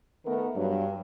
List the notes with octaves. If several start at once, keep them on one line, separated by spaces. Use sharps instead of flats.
D#3 A3 B3 A#4
G2 F#3